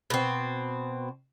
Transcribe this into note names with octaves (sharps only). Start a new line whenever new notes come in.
B2 C4